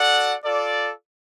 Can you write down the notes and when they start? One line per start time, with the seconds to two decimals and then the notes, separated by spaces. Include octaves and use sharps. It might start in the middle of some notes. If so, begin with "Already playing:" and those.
Already playing: F#4 A4 D5 F#5
0.45 F4 A4 D5